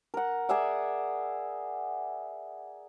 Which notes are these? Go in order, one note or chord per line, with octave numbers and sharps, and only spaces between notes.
A#4 F#5
G#4 D5 E5 F#5